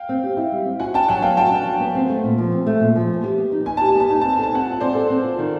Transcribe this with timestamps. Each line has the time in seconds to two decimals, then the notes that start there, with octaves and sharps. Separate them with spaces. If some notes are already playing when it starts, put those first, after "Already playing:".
Already playing: F5 G5
0.09 C4
0.23 G4
0.37 E4
0.52 G3
0.65 C4
0.80 F#4 F#5 G#5
0.94 D4 G5 A5
1.08 F#3 F#5 G#5
1.22 B3 F5 G5
1.37 F#4 G5 A5
1.51 D4
1.66 F#3
1.80 B3
1.95 C4
2.10 A3
2.24 A#2
2.38 F3
2.52 C4
2.67 A3
2.80 A#2
2.95 F3
3.09 B3
3.23 G4
3.38 B3
3.52 D#4
3.66 B3 G#5
3.77 G4 A5
3.89 G#5
3.95 B3 A5
4.10 D#4 G#5
4.21 C4 A5
4.33 G#5
4.39 A4 A5
4.53 C4 F#5 G#5
4.66 F4
4.80 C4 C5 D5
4.95 A4
5.10 C4
5.25 F4
5.39 D#3